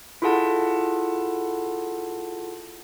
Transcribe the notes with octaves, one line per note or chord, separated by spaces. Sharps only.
E4 F4 G#4 A4 F#5 A5